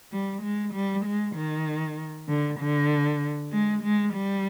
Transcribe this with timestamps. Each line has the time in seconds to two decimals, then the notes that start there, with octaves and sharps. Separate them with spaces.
0.12 G3
0.42 G#3
0.74 G3
1.05 G#3
1.35 D#3
2.28 D3
2.59 D3
3.52 G#3
3.82 G#3
4.14 G3